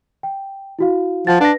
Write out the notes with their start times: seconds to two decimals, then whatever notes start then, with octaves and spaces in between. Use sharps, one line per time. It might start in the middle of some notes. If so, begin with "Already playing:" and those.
0.23 G5
0.79 E4 F#4 F5
1.27 F3 F5 F#5 A6
1.41 D4 B4 A#6